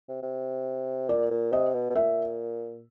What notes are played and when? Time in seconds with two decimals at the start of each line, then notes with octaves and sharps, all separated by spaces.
0.08 C3
0.23 C3
1.09 A#2 D5
1.31 A#2
1.52 C3 D#5
1.74 B2
1.90 B2
1.95 A#2 E5